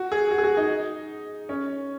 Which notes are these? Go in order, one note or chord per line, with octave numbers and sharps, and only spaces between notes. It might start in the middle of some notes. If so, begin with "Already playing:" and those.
Already playing: F#4
G#4
F#4
G#4
F#4
D#4
C#4